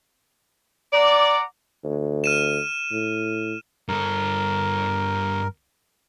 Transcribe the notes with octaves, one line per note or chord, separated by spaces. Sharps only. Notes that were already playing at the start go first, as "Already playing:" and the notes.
D5 F#5 A#5 D6
D2
F6 D#7 E7
A2
G2 A4 A#4